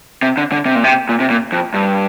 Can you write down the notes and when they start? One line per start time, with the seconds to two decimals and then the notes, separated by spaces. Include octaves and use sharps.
0.22 C3
0.37 D3
0.52 D3
0.66 C3
0.75 A#2
0.84 C3
1.09 A#2
1.20 C3
1.30 A#2
1.52 F2
1.74 G2